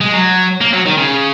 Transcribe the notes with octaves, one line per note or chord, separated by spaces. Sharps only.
G#3
F#3
A#3
F#3
D#3
C#3